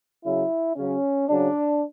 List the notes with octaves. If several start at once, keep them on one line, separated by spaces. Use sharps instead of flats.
C#3 F#3 E4
C#3 F#3 C#4
C#3 F#3 D4